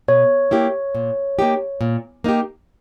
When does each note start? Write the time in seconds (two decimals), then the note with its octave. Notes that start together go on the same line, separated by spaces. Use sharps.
0.08 B2 C#5
0.51 A#3 E4 G4
0.95 A#2
1.39 A#3 D#4 G4
1.81 A#2
2.24 A#3 D#4 G4